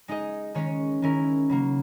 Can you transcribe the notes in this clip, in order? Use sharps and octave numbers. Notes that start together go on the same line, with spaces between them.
G#3 D#4 G#4 D#5
D#3 G#3 C#4 G#4 C#5
D#3 G#3 C#4 E4 A#4
C#3 F#3 A#3